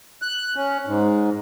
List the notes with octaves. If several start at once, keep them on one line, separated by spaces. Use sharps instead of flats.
F#6
C#4
G#2